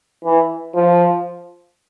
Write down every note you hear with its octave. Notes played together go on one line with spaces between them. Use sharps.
E3
F3